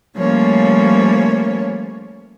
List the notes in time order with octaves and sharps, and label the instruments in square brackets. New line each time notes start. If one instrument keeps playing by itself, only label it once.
[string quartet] F3 G3 A3 A#3 C#4 C#5